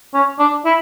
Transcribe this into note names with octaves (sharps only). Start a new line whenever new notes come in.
C#4
D4
E4